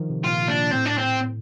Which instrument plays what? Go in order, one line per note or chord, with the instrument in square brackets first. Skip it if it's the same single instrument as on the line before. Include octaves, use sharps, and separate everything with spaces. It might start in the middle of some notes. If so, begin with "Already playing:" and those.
Already playing: [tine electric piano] D#3 F3
C3
[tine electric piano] A#2 [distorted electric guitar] F4
[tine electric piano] A#2 [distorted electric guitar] D4
[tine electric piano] A2 [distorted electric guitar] C4
[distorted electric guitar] D4
C4